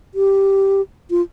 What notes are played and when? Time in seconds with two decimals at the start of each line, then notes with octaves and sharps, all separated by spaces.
0.15 G4
1.10 F4